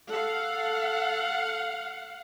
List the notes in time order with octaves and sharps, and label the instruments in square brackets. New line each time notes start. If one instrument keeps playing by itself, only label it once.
[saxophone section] A4 [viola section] F5 F#5